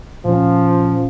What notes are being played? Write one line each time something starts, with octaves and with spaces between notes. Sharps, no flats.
A#2 F3 C#4